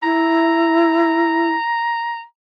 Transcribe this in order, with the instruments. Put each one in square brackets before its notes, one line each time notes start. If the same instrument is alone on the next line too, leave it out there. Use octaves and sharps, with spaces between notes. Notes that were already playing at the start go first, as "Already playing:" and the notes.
[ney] E4 [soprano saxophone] A#5